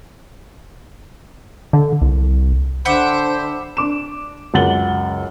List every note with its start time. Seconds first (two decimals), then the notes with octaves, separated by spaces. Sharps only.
1.73 D3
2.02 C2
2.85 D3 C5 E5 F#5 G5 B5 D6 E7
3.77 D4 D6 E7
4.54 C#2 F#2 F#5 A6 F#7 G7